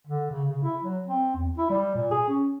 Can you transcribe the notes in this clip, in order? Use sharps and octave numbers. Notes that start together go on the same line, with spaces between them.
D3
C#3
C#3
E4
F#3
C4
E2
E4
G3
A#2
G#4
C#4